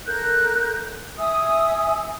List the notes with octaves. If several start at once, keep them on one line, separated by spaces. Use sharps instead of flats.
A4 A#4 F#6 G6
E5 G#5 D#6 E6